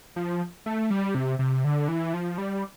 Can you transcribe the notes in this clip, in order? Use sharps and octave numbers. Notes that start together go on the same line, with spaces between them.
F3
A3
G3
C3
C3
D3
E3
F3
G3